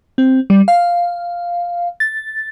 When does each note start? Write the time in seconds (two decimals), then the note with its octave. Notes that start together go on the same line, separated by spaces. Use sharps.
0.18 C4
0.50 G3
0.68 F5
2.00 A6